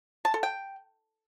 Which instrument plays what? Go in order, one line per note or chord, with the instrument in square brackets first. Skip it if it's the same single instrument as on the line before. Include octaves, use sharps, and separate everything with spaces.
[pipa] A5
A4
G5